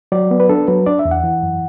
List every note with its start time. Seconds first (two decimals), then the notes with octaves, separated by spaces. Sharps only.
0.12 F#3 D5
0.31 B3
0.40 B4
0.49 D4 A4
0.68 F#3 B4
0.86 D4 D5
0.99 E5
1.05 E2
1.11 F#5
1.24 E3
1.42 F#2